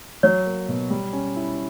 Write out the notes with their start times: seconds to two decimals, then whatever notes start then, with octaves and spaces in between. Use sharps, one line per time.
0.23 F#3 C#5
0.46 A#3
0.69 B2
0.90 G3
1.13 C#4
1.36 E4